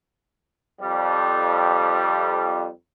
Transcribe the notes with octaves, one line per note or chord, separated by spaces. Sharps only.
F2 G3